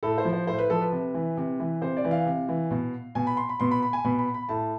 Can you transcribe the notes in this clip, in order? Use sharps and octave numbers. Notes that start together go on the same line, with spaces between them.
A2 A4
C5
F3
C5
A2 C5
B4
F3 A4
B4
C3
E3
C3
E3
C3 C5
D5
E3
F5
C3
E3
B2
B2 G#5
B5
C6
B5
B2 C6
B5
B5
G#5
B2 B5
B5
B5
A2 A5